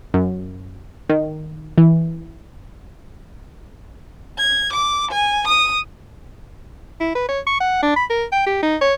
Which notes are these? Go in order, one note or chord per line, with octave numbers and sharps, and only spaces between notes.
F#2
D#3
E3
G#6
D6
G#5
D#6
E4
B4
C#5
C#6
F#5
D4
B5
A#4
G5
G4
D#4
C#5